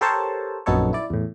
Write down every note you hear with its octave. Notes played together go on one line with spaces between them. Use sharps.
G4 A4 A#4 C5 C#5 A5
A#1 F#2 B3 D#4 A4 C#5
E4 D5
E2 A2